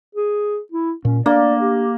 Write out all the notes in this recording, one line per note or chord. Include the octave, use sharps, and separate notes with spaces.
G#4
E4
A#2 C#4
A#3 D4 D5
G4